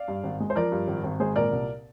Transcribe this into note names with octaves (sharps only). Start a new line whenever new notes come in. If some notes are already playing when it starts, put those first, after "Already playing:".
Already playing: D5 F5
G2
G#1
G#3
C5
F3 A#4 D5
G2
G#1
G#1
G#3 G#4 C5
A#2 A#4 D5
C2